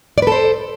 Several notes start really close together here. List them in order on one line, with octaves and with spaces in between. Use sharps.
D5 B4 A4 C5